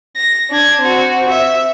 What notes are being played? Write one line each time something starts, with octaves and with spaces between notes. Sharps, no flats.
A#6
D4 G#6
C4 F#4
E5